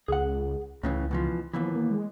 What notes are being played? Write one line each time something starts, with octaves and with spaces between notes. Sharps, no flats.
C#2 G#4 F#5
C#2 A2 C#3 E3
B2 E3 F3
D#2 B2 E3 F3
A#3
G#3